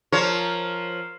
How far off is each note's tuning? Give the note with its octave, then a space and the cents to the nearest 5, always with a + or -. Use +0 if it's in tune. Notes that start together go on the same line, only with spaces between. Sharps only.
F3 +0 A#4 -5 C#5 +5